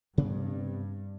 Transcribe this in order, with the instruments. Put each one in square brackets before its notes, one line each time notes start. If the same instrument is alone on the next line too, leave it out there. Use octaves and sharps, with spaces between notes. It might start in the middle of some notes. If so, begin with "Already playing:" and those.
[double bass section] G2 [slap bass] C3 B3 D4